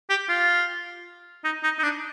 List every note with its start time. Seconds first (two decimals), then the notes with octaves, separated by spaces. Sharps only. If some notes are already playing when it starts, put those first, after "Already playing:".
0.10 G4
0.29 F4
1.44 D#4
1.63 D#4
1.79 D#4
1.83 D4